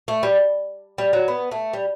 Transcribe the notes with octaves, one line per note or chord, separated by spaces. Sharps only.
A3
G3
G3
F#3
B3
A3
G3